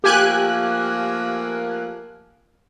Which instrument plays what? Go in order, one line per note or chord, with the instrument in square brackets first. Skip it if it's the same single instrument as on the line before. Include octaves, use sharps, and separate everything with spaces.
[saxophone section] F3 A3 A#3 [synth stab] G4 G#5 F#6